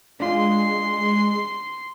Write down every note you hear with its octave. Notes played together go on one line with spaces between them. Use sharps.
G#3 D4 F4 C6